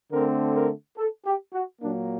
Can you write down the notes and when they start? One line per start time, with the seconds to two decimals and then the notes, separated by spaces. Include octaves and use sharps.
0.12 D3 A3 C4 A#4
0.55 A#4
0.98 A4
1.25 G4
1.54 F#4
1.82 A#2 F#3 A#3 D4